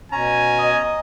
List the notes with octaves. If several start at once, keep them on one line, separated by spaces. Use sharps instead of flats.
B2 C#4 G#5 A#5
D#5